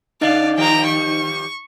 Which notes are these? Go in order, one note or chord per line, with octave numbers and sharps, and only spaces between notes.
C#3 D4 D#4 D5 D#5 F5
D#3 F3 G3 G5 A#5
C#6